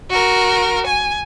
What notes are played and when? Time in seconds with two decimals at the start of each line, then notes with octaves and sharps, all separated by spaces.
0.10 F#4 A#4
0.87 G#5